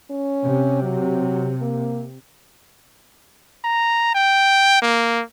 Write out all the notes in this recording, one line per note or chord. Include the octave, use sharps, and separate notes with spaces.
C#4
C3
F#3
A#3
A#5
G5
A#3